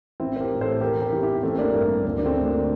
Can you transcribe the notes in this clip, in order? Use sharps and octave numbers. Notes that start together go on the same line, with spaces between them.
A1 C4 E4
C5
G4 A#4
A2 E3
A4 C5
E1 G4 A#4
G4 A#4
E2 C3 E3
E4 G4
A1 A3 C4
A#3 D4
G2 E3 A#3
D2 A#3
D4
A3 C4
D3
A#3 D4